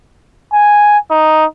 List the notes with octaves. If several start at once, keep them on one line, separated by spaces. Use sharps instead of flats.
G#5
D#4